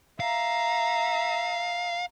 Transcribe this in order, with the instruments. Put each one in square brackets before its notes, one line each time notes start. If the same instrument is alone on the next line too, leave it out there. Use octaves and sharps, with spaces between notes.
[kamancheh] E5 A#5 [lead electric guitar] F5